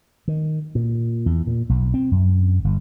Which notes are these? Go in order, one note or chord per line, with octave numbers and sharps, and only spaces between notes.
D#3
A#2
E2
A#2
B1
C4
F#2
G1